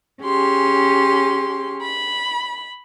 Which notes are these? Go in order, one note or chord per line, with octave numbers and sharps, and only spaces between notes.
C#4 G4 G#4 C6
B5